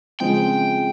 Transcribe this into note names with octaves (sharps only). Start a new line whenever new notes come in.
C#3 F3 G#3 C4 G5